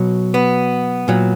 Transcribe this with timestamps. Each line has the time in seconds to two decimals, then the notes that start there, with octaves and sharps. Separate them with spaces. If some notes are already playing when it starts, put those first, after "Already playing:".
Already playing: B2 F#3
0.34 B3
1.08 A#2 F#3